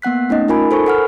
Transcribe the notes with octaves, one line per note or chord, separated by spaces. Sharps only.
A#3 B3 F#5 F#6 B6
A3 C#4 D#4 D#5
D#4 F4 A#4 G#5 B5
A4 C5 G#5 C#6
A4 A#4 F#5 B5 F6